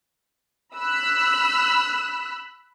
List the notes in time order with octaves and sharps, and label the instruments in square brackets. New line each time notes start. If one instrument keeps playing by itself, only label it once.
[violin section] B5 E6 F#6